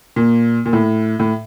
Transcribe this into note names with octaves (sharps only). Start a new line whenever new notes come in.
A#2
A#2
A2
A2